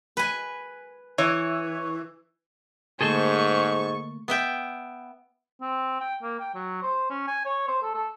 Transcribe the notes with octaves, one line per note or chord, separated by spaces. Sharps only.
B4 G#5
E3 C#5
G#2 D3 A3 A#3 G#4 A4 C5 C#6
B3 E5 G5
C4
G5
A#3
G5
F#3
C5
C#4
G#5
C#5
C5
A4
A4